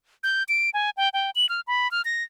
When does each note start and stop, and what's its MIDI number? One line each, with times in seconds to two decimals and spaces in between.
0.23 0.43 91
0.49 0.70 98
0.74 0.90 80
0.97 1.09 79
1.14 1.31 79
1.35 1.49 102
1.49 1.61 89
1.67 1.90 83
1.91 2.02 89
2.05 2.23 94